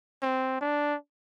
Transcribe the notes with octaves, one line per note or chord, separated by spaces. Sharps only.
C4
D4